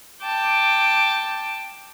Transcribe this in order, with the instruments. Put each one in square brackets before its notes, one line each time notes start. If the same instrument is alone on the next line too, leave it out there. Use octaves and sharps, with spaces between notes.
[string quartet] G5 A5 D6